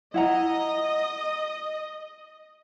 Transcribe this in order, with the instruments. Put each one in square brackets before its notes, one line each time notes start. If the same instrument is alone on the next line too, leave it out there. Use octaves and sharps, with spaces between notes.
[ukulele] E4 F#5 A#5 [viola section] D#5